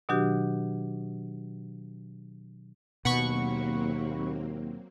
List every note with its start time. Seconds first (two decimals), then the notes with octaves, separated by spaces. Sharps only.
0.09 B2 D#3 F#3 D4 F#4 G4
3.05 D#2 B2 F#3 A#3 C4 F#5 B5 C#6